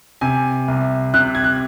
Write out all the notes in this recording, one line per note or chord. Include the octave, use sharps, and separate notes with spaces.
C3 G#5
C2
C3 F#6
G#6
F#6